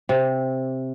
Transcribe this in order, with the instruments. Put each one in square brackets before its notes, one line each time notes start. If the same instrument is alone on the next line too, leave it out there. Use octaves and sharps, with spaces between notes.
[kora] C3